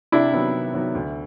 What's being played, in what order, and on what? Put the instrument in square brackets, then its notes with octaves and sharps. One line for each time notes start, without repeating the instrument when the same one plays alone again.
[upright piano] C3 [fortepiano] D4 E4
[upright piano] D#3 F#3 B3
C3
D#3 F#3 B3
D2